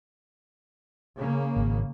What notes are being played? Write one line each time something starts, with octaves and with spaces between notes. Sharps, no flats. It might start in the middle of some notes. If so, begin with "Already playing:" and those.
C#3 A#3
G#1